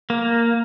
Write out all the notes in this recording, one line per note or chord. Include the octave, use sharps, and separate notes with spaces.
A#3